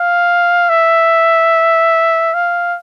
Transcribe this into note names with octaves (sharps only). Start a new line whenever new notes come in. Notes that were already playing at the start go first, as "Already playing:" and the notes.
Already playing: F5
E5
F5